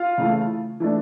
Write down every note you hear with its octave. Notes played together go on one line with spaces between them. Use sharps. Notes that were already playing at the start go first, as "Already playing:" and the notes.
Already playing: F4 F5
C#3 E3 A3
E3 A3 D4